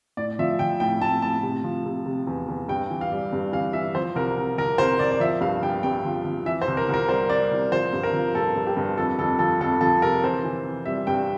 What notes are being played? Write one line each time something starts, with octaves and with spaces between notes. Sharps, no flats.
A2 D5
F3 E5
F3 G5
A2 G5
A2 A5
A2 A5
C3
F3
C3
C3
E2
E2
G2 G5
E3
F5
G3
G2
E3 F5
E3 E5
F3 C5
C2 A#4
C2
C2 A#4
C2 C5
C2 D5
D5
F3 E5
G2 F5
G2 G5
G2 G5
F3
F3
E3 E5
C5
C2
A#4
C2 A#4
G3 C5
G3 D5
C2
F3 C5
G2
A#4
F3
G2 A4
G2
G4
G2
F2 A4
F2 A4
F3 A4
F2 A4
F3 A4
C3 A#4
E3 C5
E3
E3
G3 E5
G2 G5